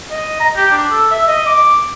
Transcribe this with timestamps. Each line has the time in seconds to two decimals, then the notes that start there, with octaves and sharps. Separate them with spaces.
0.11 D#5
0.40 A#5
0.56 G4
0.71 D4
0.91 A4
1.11 E5
1.27 D#5
1.46 D6